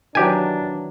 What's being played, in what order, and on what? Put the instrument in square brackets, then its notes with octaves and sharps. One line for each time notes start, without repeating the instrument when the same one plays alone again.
[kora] D#3 E3 F#3 [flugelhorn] D4 [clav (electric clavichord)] G4 G#5